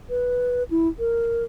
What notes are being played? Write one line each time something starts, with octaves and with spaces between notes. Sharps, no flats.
B4
E4
A#4